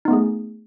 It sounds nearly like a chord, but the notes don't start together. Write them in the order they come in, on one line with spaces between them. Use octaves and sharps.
D#4 B3 A3 G#4